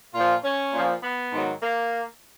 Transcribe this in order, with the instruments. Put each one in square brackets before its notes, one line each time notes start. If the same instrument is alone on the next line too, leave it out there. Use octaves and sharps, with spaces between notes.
[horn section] A#2 F3 F4
C#4
A#2 F3
B3
G#2 D#3 F#3
A#3